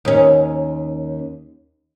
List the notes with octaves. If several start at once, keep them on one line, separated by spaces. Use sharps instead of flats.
D#2 C#4